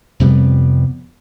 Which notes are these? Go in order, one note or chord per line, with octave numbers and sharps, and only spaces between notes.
F2 C3 G3 B3